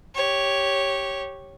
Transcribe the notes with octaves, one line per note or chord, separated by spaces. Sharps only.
G4 C#5